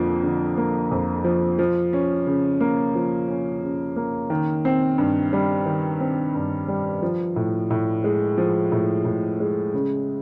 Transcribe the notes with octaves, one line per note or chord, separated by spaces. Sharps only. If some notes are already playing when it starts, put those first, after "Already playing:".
Already playing: F2 D3 F3 A#3
D3
A#3
F2
F3
F3
C#4
C#3
A#3
F3
C#4
C#3
A#3
D#3
C4
G2
G3
D#3
C4
G2
G3
F3
A2
A2
G#3
F3
A2
A2
G#3
C#3